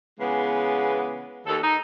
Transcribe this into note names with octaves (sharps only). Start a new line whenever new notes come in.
C#3 E3 G#3 B3
D#2 A4
D#4